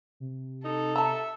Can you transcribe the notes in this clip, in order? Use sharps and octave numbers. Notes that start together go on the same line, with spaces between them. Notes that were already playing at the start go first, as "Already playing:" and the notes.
C3
D#4 A4
E5 A5 A#5